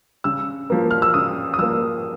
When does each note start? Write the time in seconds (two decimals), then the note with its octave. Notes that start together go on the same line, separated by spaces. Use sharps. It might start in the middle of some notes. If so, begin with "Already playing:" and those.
0.24 C#3 E6
0.70 F3 A#3
0.91 F6
1.02 E6
1.14 C#3 D#6
1.54 D#6
1.58 F3 A#3 E6